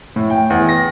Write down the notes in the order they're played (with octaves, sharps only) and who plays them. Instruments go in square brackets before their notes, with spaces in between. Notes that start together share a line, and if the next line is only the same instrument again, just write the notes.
[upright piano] A2
G5
E2
A#6